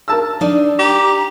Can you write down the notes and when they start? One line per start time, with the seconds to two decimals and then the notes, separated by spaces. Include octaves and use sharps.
0.08 A#4 A5 E6
0.41 D4 D#4 D5
0.79 G4 A#5